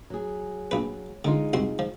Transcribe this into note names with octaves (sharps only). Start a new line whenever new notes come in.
F#3 G#4
A#1 B4
D3 G#3 D#4 F4
C2 F#4 C6
F3